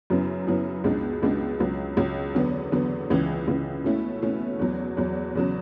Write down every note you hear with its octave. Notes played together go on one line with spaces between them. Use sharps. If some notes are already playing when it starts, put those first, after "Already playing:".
F#2 C#3 F#3 B3 E4
F#2 C#3 F#3 B3 E4
C#2 B2 G#3 D4
C#2 B2 G#3 D4
C#2 C#3 F#3
C#2 C#3 F#3
E2 D3 F#3 B3
E2 D3 F#3 B3
C#2 C#3 E3
C#2 C#3 E3
B2 A3 C#4 E4
B2 A3 C#4 E4
E2 B2 F#3
E2 B2 F#3
E2 C#3 F#3